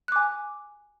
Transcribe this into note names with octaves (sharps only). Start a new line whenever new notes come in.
G#5 D6 F#6